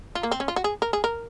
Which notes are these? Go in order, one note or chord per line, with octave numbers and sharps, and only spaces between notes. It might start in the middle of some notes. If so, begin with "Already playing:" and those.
F4
A#3
C4
C#4
F4
F#4
G#4
A#4
G#4
A#4